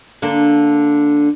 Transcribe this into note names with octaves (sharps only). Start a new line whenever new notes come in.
D3 A#3 D4